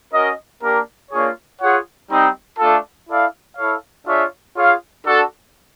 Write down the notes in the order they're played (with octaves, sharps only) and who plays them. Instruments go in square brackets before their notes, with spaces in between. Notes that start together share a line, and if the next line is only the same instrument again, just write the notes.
[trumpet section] C#4 F#4 A#4 D#5
A#3 D4 G4 A#4
A#3 D4 F4 G#4 C#5
F4 G#4 C#5 F#5
G3 C4 D#4
A3 D4 F4 A4
E4 A4 D5 F5
E4 A4 C#5 F5
D4 F4 G#4 C#5 E5
F4 G#4 C#5 F5
D4 F#4 A4